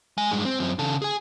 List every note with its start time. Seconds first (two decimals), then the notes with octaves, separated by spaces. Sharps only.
0.18 G#3 G#5
0.31 G2 G#3
0.45 C4
0.60 F#2 C4
0.79 C#3 A4
1.02 G#4 G#5